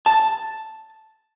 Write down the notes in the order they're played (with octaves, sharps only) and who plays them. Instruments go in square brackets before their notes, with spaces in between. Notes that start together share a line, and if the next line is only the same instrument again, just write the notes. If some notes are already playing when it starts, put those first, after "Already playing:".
[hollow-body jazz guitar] A5